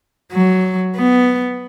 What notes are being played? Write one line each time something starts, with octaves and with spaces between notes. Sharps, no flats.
F#3
B3